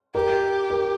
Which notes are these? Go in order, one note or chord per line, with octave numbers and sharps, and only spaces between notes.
G4 A#4
A#4